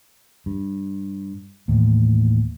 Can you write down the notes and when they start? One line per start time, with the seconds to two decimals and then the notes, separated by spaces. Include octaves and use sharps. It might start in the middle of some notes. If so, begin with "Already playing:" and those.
0.46 G2
1.68 D#2 A2 E3